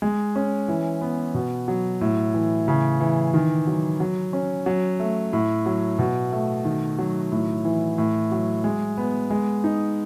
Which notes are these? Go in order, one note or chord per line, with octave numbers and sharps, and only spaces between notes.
G#3
C#4
E3
B3
B2
F#3
A2
E3
C#3
E3
D#3
F#3
F#3
C#4
F#3
A3
A2
F#3
B2
A3
D#3
F#3
A2
E3
A2
F#3
G#3
B3
G#3
D#4